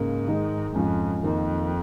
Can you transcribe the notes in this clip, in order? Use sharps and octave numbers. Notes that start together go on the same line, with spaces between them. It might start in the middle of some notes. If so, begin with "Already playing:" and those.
Already playing: G#2 C#3 A#3
D#3 G#3 D#4
F2 G#2 F3 C#4
F2 D#3 A#3 D#4